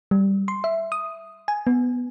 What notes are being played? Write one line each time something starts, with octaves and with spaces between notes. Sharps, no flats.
G3
C6
E5
D#6
G#5
B3